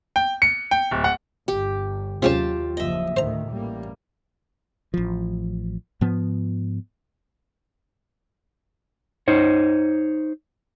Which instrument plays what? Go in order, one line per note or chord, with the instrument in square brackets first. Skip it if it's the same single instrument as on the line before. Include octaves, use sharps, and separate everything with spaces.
[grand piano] G5
C#7
G5
D1
F#5
[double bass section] G1 [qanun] G4
[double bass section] D#2 F#3 [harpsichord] C3 G#3 C#4 [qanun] F4 G4 A5
[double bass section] F#1 F3 [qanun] D#5 E5
[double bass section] D2 A2 D#3 [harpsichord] C5 A#5
[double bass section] A1 G3 A#3
[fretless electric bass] A1 F3
G#2 F3 B3
[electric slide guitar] D#4 C5 C#5